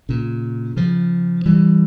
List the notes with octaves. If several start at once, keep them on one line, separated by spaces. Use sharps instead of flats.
A#2 C#3
C#3 F3
E3 G3